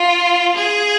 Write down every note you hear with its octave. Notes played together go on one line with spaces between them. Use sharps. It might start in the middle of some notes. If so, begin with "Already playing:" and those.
Already playing: F4
G#4